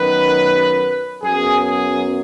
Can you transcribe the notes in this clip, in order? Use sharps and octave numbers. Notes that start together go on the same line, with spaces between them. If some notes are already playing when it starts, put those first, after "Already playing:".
Already playing: F#2 D#3 F#3 B3 B4
F#2 F#3 B3 G#4
G#4